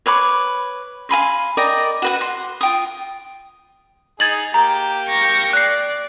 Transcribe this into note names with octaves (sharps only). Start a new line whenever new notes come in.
B4 C#5 B5 D6
F5 G#5 B5 C6
A#4 D5 D#5 G5
F#4 B4 F#5
C6
F4 G5 D#6
D#4 G#4 G#6 A6 F#7
A#3 G4 G5 A#5
C#6 A#6
D5 F#6 C7